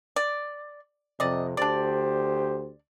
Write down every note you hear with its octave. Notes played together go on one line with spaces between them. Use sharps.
D5
F2 C3 D5 D#5
D2 D4 G4 C5 D5